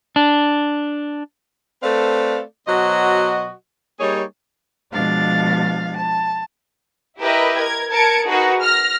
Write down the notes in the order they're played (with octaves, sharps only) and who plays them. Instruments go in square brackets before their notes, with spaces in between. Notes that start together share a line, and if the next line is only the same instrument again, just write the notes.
[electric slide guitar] D4
[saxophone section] A3 C4 A4 B4 D5 F5
B2 F#3 F#4 C5 D#5
G3 A#3 D#4 G#4 C#5
[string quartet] B2 F3 G#3 D4 F5 A6
A5
[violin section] E4 G4 A#4 B4 D#5 E5
A#4 G#6
A#4 A5 G#6 C#7 D7
D#4 F#4 G#4 A#4 B4
F6 A#6